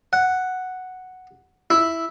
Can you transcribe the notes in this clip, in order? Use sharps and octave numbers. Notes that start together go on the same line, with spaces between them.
F#5
E4